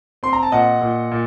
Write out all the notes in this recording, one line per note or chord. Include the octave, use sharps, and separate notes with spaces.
C4 C6
A#5
A5
A#2 D#5 F#5
A#2
A#2